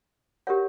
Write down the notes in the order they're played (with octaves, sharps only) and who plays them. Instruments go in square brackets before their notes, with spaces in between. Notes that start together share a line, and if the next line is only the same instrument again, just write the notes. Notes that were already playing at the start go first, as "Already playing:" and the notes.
[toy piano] G4 A#4 C#5 F#5